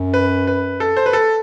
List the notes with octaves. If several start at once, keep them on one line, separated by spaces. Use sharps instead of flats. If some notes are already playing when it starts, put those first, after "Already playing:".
Already playing: F#2
B4
B4
A4
C5
B4
A4